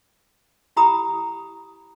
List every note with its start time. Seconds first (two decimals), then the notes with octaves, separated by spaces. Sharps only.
0.77 E4 G4 A#5 B5 D#6